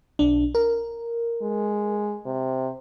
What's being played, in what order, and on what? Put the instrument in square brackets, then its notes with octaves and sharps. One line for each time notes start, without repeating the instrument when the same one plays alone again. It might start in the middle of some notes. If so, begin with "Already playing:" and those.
[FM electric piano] B1 D4
A#4
[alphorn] G#3
C3